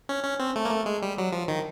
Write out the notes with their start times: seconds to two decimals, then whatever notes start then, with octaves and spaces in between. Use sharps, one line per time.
0.09 C#4
0.24 C#4
0.40 C4
0.56 A3
0.65 A#3
0.71 A3
0.86 G#3
1.02 G3
1.18 F#3
1.32 F3
1.48 D#3